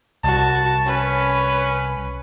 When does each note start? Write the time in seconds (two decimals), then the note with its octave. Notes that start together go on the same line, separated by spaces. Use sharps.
0.24 C2 F#4 A5
0.86 C#4 B4